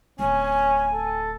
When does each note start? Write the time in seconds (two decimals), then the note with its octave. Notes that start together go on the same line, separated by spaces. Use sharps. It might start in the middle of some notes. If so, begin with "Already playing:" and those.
0.19 D1 C#4 G#5
0.93 A4